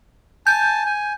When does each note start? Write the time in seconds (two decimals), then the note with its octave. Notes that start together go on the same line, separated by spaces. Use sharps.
0.47 G#5 A5 G6
0.86 G#5